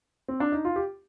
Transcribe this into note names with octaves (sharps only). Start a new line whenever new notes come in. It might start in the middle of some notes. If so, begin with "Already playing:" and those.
C4
D4
D#4
F4
G4